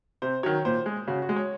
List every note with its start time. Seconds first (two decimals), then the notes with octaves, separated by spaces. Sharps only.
0.22 C3 C5
0.43 D#3 F#3 C#5
0.65 A#2 C5
0.86 G#3
1.07 C#3 F#4
1.22 F#4
1.29 G#3
1.36 C#5